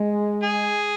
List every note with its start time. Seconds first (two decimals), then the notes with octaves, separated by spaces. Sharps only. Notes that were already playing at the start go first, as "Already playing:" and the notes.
Already playing: G#3
0.43 G#4